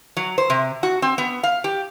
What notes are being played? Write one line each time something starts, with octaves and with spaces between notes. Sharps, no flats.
F#3
C5
C3
F#4
C4
B3
F5
G4